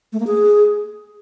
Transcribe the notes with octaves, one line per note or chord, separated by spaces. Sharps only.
A3
A#3
G#4